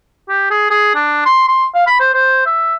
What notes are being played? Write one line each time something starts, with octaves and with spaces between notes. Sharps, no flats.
G4
G#4
G#4
D4
C6
C6
F5
B5
C5
C5
E5